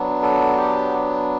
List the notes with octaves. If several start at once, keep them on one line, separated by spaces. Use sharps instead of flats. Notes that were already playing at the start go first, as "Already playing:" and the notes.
Already playing: F#3 B3 D4
A4
G4